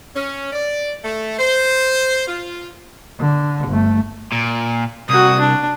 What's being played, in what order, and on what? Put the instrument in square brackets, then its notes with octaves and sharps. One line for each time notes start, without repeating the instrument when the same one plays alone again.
[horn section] C#4
D5
A3
C5
F4
[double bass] D3
G1 A3
[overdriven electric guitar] A#2
[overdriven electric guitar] C2 [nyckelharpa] F#4 D#6
[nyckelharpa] D4